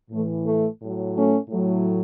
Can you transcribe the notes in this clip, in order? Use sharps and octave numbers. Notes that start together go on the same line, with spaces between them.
A2 E3 A3
A3
A2 F#3
A3 C#4
A2 F#3